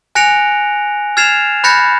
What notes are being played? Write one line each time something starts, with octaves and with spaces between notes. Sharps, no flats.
G#5 F#6 A#6 C#7 D7 F7
F6 G#6 A6 C7 E7 F7
B5 F#6 G6 A6 A#6 C#7